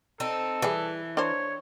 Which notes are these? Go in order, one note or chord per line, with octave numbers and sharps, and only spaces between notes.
C4 D#4 A4
E3 G3 G#4
D4 A#4 C5 C#5